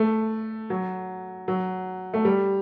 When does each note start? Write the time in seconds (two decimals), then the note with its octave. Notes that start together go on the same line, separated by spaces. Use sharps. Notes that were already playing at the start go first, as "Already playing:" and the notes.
Already playing: A3
0.70 F#3
1.48 F#3
2.14 A3
2.25 G3